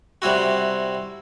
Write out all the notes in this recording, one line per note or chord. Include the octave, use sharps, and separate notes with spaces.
C3 G3 E4 F#4